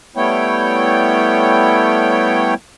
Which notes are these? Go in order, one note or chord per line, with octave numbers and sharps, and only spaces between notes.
G3 A3 B3 E4 C#5 G5